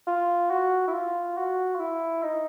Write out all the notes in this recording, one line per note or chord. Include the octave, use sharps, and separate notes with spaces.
F4
F#4
E4
F4
F#4
F4
E4
D#4